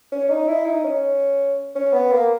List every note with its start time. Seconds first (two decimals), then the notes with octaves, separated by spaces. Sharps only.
0.12 C#4
0.30 D#4
0.48 E4
0.66 D#4
0.84 C#4
1.75 C#4
1.93 B3
2.12 A#3